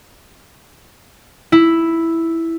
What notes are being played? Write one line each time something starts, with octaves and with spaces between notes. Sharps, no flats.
E4